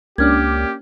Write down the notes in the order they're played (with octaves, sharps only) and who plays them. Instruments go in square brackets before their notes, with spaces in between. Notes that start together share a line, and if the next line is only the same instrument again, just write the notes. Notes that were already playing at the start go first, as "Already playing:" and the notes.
[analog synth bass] C#2 [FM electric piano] A#3 C#4 D4 [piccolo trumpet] G4 [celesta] D6 F6 G#6